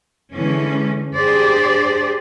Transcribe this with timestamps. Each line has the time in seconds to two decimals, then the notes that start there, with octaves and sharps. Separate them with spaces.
0.33 D3 E3 G#3 C#4
1.16 D4 G4 G#4 C5 D5